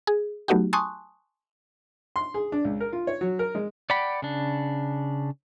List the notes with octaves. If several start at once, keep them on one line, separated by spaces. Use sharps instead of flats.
G#4
F#3 A3 B3 D#4 F#4 G4
G#5 A5 C6 C#6 D#6 F#6
C6
G#4
D4
C#2
A#4
F4
C#5
F#3
A#4
G#3
D5 F#5 G5 B5
C#3 D4